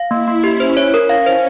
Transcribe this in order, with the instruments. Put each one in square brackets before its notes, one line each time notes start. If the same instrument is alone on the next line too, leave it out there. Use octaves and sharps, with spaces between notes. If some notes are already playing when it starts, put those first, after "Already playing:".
Already playing: [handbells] F5
[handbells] A#3 [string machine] E4
[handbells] A#3
[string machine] C#4 [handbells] G4
[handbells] C5
C#5
A#4
[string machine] C#4 [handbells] F5
[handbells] C5